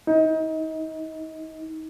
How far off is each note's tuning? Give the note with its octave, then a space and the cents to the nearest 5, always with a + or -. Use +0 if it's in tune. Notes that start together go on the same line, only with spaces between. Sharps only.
D#4 +30